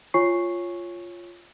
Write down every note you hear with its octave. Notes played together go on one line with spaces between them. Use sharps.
F4 C#5 G#5 C#6 C7